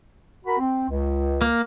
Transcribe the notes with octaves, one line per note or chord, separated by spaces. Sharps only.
F#4 A#4 B5
C4
C#2
A#3